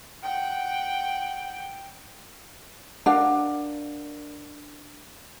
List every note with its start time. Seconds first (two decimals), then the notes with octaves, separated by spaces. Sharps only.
0.23 F#5 G5
3.06 D4 A#4 F5 F#5